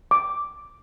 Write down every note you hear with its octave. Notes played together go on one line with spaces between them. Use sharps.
D6